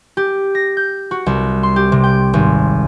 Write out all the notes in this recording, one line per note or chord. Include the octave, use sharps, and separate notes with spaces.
G4
A#6
G6
F#4
C2
C6
G4
C3
G5
G#1